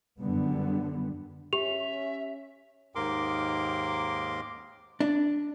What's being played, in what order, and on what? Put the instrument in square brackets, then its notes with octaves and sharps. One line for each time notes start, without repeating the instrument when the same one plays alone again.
[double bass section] F#2 D3 G3 B3
[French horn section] C#4 [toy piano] G4 [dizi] E5 [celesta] F7
[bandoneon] D#2 G#2 A#3 A#4 C6 D6
[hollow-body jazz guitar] D4